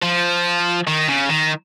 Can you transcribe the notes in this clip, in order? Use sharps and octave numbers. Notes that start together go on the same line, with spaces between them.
F3
D#3
C#3
D#3